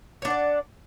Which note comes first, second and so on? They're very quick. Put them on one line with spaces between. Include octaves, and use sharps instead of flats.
C#5 D4 F#5 D5